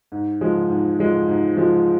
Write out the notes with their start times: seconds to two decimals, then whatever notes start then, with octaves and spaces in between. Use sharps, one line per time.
0.12 G#2
0.41 F3 G#3
0.70 G#2
0.99 F3 G#3
1.28 G#2
1.57 F3 G#3